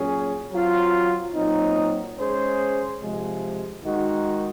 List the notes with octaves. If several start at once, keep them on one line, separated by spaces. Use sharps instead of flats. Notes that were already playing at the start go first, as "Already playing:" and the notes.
Already playing: A#2 F#3 C#4 G#4
F#3 C4 F4
A#2 F#3 C4 D#4
G#3 C#4 G#4 C5
C3 F3 G#3
D#3 G#3 D#4 F#4